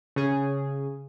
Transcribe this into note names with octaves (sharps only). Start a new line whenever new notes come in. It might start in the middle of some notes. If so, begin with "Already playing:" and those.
C#3 G#4